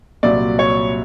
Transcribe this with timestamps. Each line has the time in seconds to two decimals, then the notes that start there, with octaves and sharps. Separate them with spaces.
0.23 C2 A#2 F#3 D5
0.59 C#5